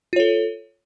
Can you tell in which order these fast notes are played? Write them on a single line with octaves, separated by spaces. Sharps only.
F4 C#5 A4